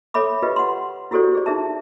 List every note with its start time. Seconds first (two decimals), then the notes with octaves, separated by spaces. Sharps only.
0.14 A4 C#5 E5 B5 D6
0.42 F4 G4 B4 D#5
0.56 F#5 C6
1.11 E4 F#4 G4 A4 C5 D5
1.35 G#4 D5
1.46 D#4 E4 G#4 E5 A5